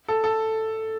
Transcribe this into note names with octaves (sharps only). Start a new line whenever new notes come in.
A4
A4